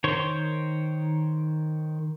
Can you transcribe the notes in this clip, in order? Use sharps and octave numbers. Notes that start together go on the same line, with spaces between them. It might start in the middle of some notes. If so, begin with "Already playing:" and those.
D#3 C5 C#5